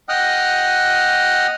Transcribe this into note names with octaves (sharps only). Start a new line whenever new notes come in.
D#5 F#5 G5 D#6 F6 F#6